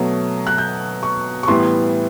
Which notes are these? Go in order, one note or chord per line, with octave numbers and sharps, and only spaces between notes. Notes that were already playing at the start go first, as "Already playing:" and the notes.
Already playing: B2 F#3 A3
F#6
G6
C#6
C#6
A2 E3 G3 B3 C6